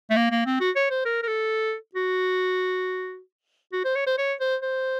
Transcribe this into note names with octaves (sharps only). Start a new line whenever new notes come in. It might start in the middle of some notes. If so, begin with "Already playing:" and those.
A3
A#3
A#3
C4
F#4
C#5
C5
A#4
A#4
A4
F#4
F#4
C5
C#5
C5
C#5
C5
C5